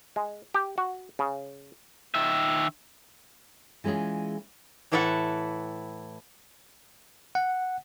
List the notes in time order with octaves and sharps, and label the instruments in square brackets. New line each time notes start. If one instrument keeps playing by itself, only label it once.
[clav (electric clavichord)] G#3
G4
F#4
C#3
[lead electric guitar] D#3 E5
[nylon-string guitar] E3 G#3 C#4 F4 G#4
[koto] A2 E3 E4 A4 E5 F#5
[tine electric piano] F#5